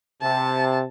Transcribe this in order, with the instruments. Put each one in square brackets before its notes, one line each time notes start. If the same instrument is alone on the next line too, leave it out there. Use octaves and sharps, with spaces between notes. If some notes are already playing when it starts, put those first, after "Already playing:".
[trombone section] C3 [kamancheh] A5